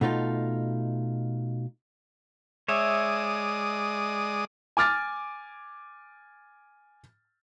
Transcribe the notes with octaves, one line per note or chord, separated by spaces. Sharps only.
B2 A3 D#4 F4
G#3 C#5 D5 E5 D#6
G#5 D6 F6 A6